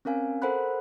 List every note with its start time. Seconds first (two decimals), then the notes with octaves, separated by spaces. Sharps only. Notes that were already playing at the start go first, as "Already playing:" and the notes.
0.05 C4 C#4 A#4 F5 G#5
0.42 A4 A#4 C5 F#5 B5 F#6